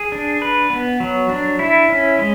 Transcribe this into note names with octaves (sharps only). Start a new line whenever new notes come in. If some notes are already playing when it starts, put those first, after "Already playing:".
Already playing: G#4
D4
B4
B3
F#3
D4
E4
C#4
G#3